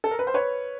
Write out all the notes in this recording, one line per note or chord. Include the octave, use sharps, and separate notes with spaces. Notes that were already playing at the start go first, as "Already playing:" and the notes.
A4
A#4
B4
C5
B4 C#5